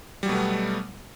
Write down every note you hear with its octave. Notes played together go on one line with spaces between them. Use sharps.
B2 F#3 G3 A3 B3